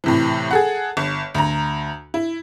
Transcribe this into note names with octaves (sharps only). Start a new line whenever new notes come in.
A2 C3 E3
G#4 A4 F#5
G1
D2 A#5
E4